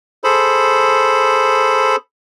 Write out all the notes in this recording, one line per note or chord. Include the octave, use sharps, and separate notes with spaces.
G#4 A4 C5 B5